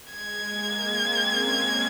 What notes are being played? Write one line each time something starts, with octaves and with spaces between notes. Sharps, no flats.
G#3 G#6
A#3
C4
C#4